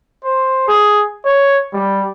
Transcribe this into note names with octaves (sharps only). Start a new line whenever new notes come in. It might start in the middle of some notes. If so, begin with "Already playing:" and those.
C5
G#4
C#5
G3